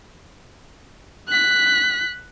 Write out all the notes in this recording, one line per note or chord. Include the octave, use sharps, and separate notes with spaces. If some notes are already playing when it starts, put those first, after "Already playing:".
F#6 B6